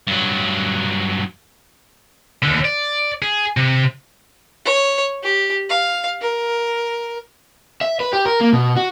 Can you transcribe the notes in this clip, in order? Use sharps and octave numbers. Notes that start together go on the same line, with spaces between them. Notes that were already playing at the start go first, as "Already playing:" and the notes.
G2 F#3
D#2 D3
D5
G#4
C3
C#5
G4
F5
A#4
E5
B4
G4
A#4
A#3
B2
F#4